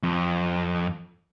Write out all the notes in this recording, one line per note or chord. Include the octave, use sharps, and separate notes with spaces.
F2